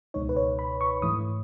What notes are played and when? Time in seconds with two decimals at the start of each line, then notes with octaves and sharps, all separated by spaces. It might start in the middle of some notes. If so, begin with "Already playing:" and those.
0.14 C#2 B2 G#3 D#4 C#5
0.29 B4
0.36 C#5
0.59 B5
0.81 C#6
1.02 G#2 E3 A3 E4 D#6